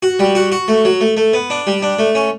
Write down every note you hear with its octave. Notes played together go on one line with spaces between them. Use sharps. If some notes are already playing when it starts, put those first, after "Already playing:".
F#4
G3
F#4
F#4
A3
F#3
A3
A3
B3
D4
G3
D4
A3
C#4